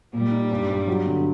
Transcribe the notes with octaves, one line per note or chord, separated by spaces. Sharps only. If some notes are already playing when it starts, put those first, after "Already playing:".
A#2 G3
D#4
G2
G2
F#3
D3